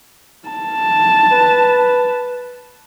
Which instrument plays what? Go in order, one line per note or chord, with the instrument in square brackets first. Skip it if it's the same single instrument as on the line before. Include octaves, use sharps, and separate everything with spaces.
[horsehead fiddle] A5
[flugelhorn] B4